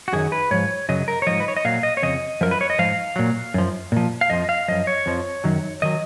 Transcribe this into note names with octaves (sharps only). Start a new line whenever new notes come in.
F#4
F#2 D#3 F#3 G#4
B4
G#2 F3 C#5
F#2 C#3 F#3 D#5
A#4
C#5
G#2 F3 D#5
B4
C#5
D#5
A#2 F#3 F5
D#5
C#5
F2 C#3 D#5
F#2 F3 A#4
B4
C#5
D#5
G#2 F3 F5
A#2 F#3
F#2 F3
A#2 F3
F5
F2 F3 D#5
F5
F#2 F3 D#5
C#5
F2 F3
F#2 D#3 F#3
D#3 F#3 D#5